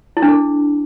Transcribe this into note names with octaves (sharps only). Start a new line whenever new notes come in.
E4
D4
A4